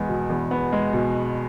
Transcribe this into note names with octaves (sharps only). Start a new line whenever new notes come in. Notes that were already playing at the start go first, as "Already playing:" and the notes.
Already playing: E2 G#3 B3
B2
E2
B3
G#3
B2